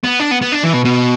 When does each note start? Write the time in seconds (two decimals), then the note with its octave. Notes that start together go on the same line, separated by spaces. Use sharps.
0.04 B3
0.20 D4
0.31 B3
0.42 B3
0.52 D4
0.63 E3
0.73 B2
0.85 B2